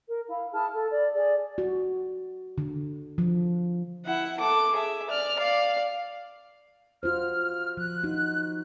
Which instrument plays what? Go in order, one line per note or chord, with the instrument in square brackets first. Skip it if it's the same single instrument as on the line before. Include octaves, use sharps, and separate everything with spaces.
[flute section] A#4
E4 F5
E4 G#4 A5 F6
A4
D5
G#4 D5
[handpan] F#4
D3
F3
[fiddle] E4 F#5
A4 D6
G#4 E5
D5 F6
D5 F5
[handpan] F4 F#4 C5 [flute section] F6
[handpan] F3 [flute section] F#6
[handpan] D#4 F#4